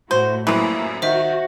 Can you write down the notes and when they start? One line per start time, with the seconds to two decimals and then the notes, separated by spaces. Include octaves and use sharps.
0.11 A2 E4 F#4 C5
0.47 A#1 F#2 A2 E3 A#3 C4 E5
1.02 D#3 F#4 C5 E5